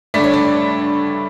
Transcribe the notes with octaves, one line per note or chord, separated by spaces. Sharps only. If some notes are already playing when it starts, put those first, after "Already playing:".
G2 D3 A3 D5
C#5
D5